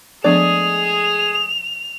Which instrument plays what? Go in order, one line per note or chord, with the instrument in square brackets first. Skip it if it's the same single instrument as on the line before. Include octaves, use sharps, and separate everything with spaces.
[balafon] F3 B3 D4 [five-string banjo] G#3 A3 D5 [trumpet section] G#4 [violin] F7